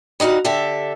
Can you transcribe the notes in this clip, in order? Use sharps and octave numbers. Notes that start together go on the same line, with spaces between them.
G3 D#4 F#4 F5 F#5
D3 G4 A4 E5